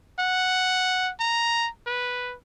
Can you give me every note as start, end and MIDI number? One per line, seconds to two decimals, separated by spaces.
0.19 1.11 78
1.20 1.69 82
1.87 2.34 71